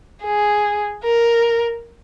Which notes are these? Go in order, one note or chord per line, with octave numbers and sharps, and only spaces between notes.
G#4
A#4